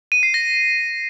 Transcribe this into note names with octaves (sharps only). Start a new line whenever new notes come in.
D#7
C7
A#6